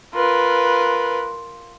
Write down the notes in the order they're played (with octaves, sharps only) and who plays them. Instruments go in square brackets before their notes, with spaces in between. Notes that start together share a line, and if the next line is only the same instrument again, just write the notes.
[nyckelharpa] F4 A#4 [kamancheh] B4